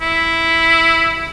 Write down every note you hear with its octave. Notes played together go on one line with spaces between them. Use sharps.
E4